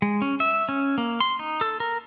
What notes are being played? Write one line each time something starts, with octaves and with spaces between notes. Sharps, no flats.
G#3
C#4
E5
C#4
A#3
C6
D#4
A4
A#4